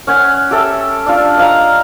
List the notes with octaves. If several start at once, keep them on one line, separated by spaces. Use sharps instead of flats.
C#4 F#5 G#5
G4 A4 E5
D4 F4
D#5 F5 A#5